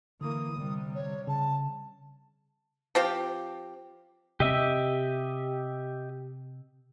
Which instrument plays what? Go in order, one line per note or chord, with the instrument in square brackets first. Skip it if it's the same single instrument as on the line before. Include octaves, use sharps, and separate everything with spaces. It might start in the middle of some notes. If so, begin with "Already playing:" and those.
[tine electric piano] D3 [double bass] E3 A#3 [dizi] D#6
[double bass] C3 G3
[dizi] C#5
[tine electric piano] C#3 [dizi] A5
[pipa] F3 C4 G4
[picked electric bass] C3 C4 [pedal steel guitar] G4 D#5 E5